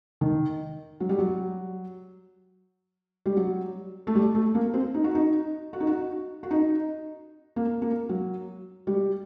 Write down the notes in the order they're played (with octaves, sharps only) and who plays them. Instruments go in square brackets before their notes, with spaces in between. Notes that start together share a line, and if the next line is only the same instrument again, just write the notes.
[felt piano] D#3
F#3
G3
F#3
G3
F#3
A3
G3
A3
A#3
C4
D#4
F#4
D#4
F#4
D#4
F#4
F#4
D#4
A#3
A#3
F#3
G3